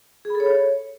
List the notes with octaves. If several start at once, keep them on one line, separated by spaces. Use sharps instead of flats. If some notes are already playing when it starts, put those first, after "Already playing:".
G#4
B5
A4
C#5